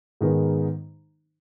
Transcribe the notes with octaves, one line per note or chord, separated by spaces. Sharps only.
G#2 D#3 G#3 B3 D#4